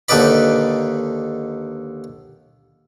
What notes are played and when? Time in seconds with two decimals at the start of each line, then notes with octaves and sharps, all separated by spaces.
0.09 D#2 D3 D#4 B4 D5 B5